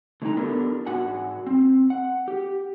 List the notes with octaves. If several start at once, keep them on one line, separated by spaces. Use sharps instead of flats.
D3 A3 D#4 E4 G5 A#5
B3 D4 E4 G4 A4 A#4
G#2 F#4 F#5 G#5
C4
F#5
G4